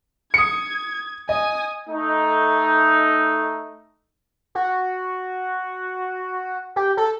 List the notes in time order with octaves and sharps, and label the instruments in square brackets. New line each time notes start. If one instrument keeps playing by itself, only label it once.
[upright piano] D#6 C#7 [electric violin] G#6
[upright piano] D#5 [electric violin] G#5 D#6
[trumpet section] A3 D#4
[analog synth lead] F#4
G4
A4